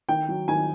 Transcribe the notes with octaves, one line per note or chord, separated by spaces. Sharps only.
D#3 G5
F#3
D#3 G#5